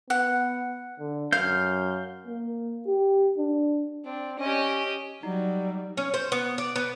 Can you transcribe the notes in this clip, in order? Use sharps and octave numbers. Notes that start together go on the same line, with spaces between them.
B3 F#5
D3
F#2 F5 G6
A#3
G4
D4
C4 D4
C#4 G4 D#5
F#3 G3 D#4
C#4
C5
B3
D5
B3